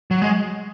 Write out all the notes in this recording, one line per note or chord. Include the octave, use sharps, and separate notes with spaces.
F#3
G#3